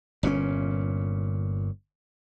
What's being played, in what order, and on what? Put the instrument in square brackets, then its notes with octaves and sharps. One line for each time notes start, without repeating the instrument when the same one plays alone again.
[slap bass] G1 A#2 C#3 C#4